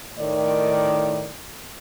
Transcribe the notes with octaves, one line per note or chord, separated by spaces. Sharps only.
A2 D#3 D5